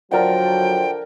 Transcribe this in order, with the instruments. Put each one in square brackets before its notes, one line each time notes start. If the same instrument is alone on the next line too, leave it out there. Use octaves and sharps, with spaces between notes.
[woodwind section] D3 F3 [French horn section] F#3 [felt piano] A#4 D5 F#5 [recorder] G5